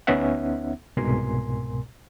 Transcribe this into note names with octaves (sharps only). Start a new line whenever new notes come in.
D2 B3 C#4 D#4 E5 F#5
C2 G#2 B2 A#4 G#5 C6